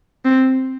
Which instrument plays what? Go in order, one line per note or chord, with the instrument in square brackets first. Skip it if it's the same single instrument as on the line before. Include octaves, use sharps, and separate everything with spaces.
[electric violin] C4